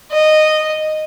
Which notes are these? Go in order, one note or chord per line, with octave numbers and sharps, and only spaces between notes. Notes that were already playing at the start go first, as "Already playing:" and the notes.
D#5